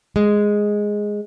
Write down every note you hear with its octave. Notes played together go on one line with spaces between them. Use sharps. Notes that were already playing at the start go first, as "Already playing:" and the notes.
G#3